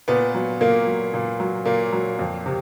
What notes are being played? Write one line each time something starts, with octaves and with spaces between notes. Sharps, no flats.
A#2 B3
F#3
A#2 A#3
F#3
A#2
F#3
A#2 A#3
F#3
F2
C3